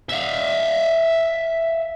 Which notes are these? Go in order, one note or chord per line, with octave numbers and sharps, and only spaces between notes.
E5 F5